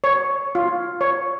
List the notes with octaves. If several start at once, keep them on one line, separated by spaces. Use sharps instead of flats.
C#5
F4
C#5